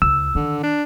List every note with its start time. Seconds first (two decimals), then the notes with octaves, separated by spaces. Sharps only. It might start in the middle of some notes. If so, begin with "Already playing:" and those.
0.02 C#2 E6
0.35 D3 D#3
0.64 D4